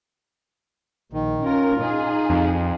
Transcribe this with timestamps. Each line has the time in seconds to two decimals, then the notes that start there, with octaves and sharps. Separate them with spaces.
1.13 A#1 D#3
1.45 C#4 F4 A#4
1.80 D#4 G#4
2.30 F2